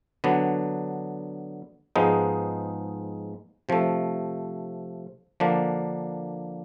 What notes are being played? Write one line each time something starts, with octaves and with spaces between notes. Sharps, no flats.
D3 F#3 B3 D4
G#2 F3 G#3 B3 D#4
C3 F3 A3
D3 F3 A#3 D4